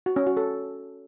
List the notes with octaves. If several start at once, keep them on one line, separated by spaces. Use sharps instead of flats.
F#4
C#4
F#4
A4